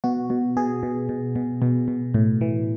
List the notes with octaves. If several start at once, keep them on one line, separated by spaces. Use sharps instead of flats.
B2 F#4
B2
B2 G#4
B2
B2
B2
B2
B2
A2
E3